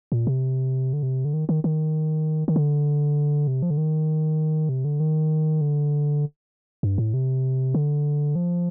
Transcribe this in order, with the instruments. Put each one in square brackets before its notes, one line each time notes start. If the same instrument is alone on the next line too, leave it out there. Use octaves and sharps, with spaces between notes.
[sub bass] A#2
C3
D3
C3
D3
D#3
D#3
D#3
D#3
D3
C3
F3
D3
D#3
C3
D3
D#3
D3
G2
A2
C3
D3
F3